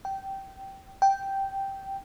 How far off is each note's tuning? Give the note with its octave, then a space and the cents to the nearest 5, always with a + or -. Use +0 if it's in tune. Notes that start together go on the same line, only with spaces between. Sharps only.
G5 -15
G5 -5